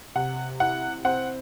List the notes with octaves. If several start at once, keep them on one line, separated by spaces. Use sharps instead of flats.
C3 F#5
E4 F#5
C4 F#5